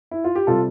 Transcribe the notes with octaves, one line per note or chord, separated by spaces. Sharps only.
E4
F4
G4
C3 G3 F4 A4